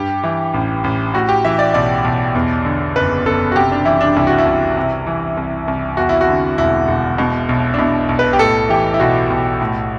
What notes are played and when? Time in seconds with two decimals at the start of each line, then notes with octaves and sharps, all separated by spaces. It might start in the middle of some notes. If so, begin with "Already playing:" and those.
Already playing: G2 G4
0.23 E3
0.54 A1
0.84 A1
1.14 A2 F#4
1.29 G4
1.45 E3 E5
1.59 D5
1.74 B1 D5
2.05 B1
2.35 E2
2.65 D3
2.96 F#1 B4
3.26 F#1 A4
3.52 F#4
3.56 C3 G4
3.71 D4
3.85 E3 E4
4.01 D4
4.16 C2 E4
4.27 F#4
4.38 E4
4.46 C2
4.77 C3
5.07 E3
5.37 C2
5.68 C2
5.97 E2 F#4
6.09 E4
6.21 F#4
6.28 D3
6.58 E1 E4
6.88 E1
7.18 B2
7.49 B1
7.74 D4
7.78 B2 E4
8.09 B1
8.19 B4
8.33 G4
8.39 A2 A4
8.69 E3 G4
8.94 E4
9.00 B1 F#4
9.30 B1
9.61 A2